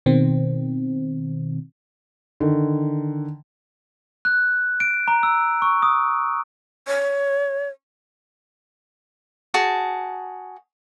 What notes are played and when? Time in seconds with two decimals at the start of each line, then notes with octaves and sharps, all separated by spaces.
0.06 B2 D#3 C4
2.40 D3 D#3
4.25 F#6
4.80 D7
5.08 A#5
5.23 E6
5.62 C#6
5.82 D#6
6.87 C#5
9.54 F#4 G#4 A5